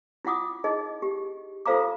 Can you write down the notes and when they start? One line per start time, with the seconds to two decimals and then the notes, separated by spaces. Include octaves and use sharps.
0.25 E4 F4 F#5 D6 D#6
0.64 D#4 E4 G#4 D#5
1.02 G4
1.66 F4 A4 C5 F5 A#5 D6